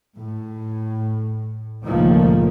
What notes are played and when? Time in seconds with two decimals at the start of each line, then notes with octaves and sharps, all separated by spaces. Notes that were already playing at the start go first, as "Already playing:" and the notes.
0.15 A2
1.84 C#2 A#2 D#3 F3 A3 A#3